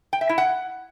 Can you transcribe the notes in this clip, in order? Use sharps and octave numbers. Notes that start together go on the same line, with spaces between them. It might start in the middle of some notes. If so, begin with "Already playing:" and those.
G5
E5
E4
F#5